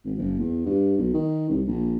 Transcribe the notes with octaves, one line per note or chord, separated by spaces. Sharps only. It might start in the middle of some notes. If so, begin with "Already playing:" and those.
G#1
F#1
E2
G2
B1
D#3
C2
A#1